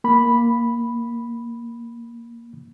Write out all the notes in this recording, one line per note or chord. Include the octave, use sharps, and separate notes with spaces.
A#3 B5